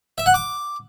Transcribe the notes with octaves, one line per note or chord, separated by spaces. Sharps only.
E5
F#5
D6